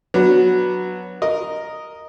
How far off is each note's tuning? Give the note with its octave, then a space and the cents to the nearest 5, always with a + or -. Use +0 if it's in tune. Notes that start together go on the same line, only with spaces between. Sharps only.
F#3 -10 B3 -10 D4 +0
A#4 +0 D#5 +0